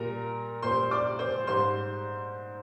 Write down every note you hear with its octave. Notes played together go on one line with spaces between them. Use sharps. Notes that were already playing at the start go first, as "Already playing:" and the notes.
Already playing: A#2 G3 A#4 A#5
A#2 G3 C5 C6
D5 D6
C5 C6
G#2 G3 C5 C6